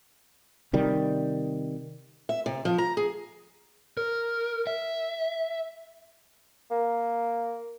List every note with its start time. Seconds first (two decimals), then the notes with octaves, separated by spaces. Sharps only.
0.73 C3 D#3 G3
2.29 E5
2.46 C3
2.65 F3
2.78 A#5
2.97 G#4
3.97 A#4
4.67 E5
6.71 A#3